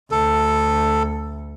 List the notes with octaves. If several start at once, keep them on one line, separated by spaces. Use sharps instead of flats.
D2 A4